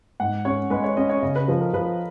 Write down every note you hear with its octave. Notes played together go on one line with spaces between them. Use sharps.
G#2 F#5
C#4 C#5
G#3 B4
C#5
C#4 D#5
C#5
C#3 D#5
B4
F3 B4
A#4
F3 B4